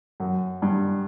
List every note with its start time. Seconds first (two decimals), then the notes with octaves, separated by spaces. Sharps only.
0.20 F#2
0.62 G2